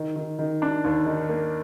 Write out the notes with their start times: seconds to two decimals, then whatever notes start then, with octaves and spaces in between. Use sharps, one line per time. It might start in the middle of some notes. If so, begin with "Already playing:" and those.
Already playing: D#3
0.16 D#3
0.39 D#3
0.62 D4
0.84 D#2
1.06 D#3
1.29 A#3